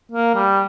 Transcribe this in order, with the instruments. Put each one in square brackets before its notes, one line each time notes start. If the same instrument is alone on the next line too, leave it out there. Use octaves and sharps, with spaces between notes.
[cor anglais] A#3
G3